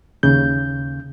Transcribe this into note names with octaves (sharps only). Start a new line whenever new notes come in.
D#2 C#3 G6